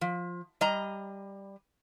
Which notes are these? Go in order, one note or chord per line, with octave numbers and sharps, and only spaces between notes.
F3
G3 D#5 A#5